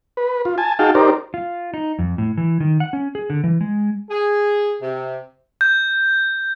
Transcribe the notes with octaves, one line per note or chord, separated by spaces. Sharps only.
B4
F4
G#5 A5
D#4 F#4 G#4 F5 G5 A5
D#4 G4 A#4 C5 D5
F4
D#4
F2
A2
E3
D#3
F#5
C#4
G#4
D3
E3
G#3
G#4
C3
G6